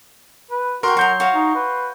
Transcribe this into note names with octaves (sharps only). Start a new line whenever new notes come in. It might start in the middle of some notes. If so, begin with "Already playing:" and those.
B4
F#4 A#4 G5 C6 C#6
F#3 F#4 A#4 C6 G6
F#4 C#5 F5
D#4
B4